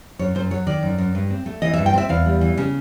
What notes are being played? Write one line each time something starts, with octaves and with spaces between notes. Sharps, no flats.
F#2 C#5
F#2 C5
F#3 C#5
D#3 D5
F#2
F#2
G2
C4
A3
E3 D#5
E5
G2
G5
C4 E5
E2 F5
G3
E3
C#3